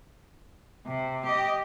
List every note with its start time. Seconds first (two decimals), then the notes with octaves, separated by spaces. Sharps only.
0.87 C3
1.25 G4 D#5